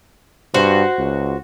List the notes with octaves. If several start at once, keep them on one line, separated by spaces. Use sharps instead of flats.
G2 F#4 C5
C#2